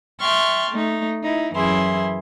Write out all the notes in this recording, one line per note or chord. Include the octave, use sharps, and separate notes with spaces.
E5 G5 A5 C6 C#6 F6
A3 D#4
D#4 E4
F#2 E3 E4 G#4 C6